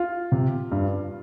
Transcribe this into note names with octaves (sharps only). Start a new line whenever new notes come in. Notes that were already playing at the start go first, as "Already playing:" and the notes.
Already playing: F4
C3
G2